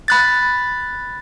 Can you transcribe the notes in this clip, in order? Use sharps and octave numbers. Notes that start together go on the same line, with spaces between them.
B5 F#6 A6